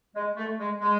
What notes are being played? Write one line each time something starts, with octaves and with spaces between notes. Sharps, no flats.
G#3
A3
G#3
G#3